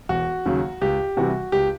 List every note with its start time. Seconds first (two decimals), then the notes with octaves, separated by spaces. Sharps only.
0.09 E1 F#4
0.46 D#2 C#3 F#3
0.81 C#2 G4
1.17 C3 E3 G3 F#4
1.52 C#2 G4